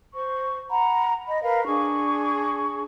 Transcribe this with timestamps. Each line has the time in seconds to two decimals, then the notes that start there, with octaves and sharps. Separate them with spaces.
0.13 C5 C#6
0.69 F#5 A#5 B5
1.27 D#5 B5
1.42 A#4 B4 F5
1.65 D4 G#4 C#6